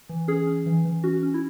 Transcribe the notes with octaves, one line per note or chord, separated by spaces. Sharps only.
E3
C#4 G#4
C#4
E3
E3
C#4 F#4
C#4
E4